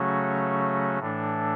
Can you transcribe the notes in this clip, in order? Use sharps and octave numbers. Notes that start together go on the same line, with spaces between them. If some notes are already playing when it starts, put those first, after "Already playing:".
Already playing: C#3 F#3 A3 C#4 F#4
A2 E3 A3 D4